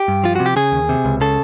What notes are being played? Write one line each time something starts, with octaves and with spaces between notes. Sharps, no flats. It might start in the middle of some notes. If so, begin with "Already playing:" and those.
Already playing: G4
G2
F3 F4
C3 F#4
G4
C#3 G#4
D#2
C3
C#2
C#3 A4